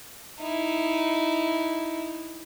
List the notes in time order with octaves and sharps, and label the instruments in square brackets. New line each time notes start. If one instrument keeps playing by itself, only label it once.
[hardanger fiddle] D#4 E4